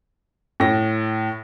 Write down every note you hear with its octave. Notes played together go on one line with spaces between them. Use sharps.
A2 A#6